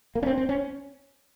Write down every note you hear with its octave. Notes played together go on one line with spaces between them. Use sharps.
A#3
C#4
C4
C4
C#4